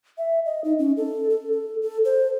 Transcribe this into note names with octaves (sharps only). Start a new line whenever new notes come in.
E5
D#5
D#4
C#4
A4
A4
A4
A4
C5